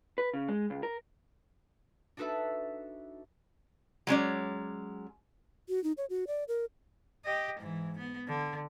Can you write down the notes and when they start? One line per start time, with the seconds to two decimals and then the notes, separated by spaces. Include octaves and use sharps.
0.18 B4
0.33 C#3
0.48 G#3
0.70 C#2
0.83 A#4
2.17 D4 D#4 F#4 A4 B4 E5
4.07 F#3 G#3 C#4 D5
5.69 F#4
5.84 D#4
5.98 C#5
6.10 F#4
6.27 D5
6.48 A#4
7.25 G4 D#5
7.60 G#2 E3
7.98 B3
8.27 D3